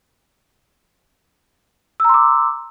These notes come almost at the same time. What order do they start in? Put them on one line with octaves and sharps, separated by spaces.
E6 A#5 C6 D6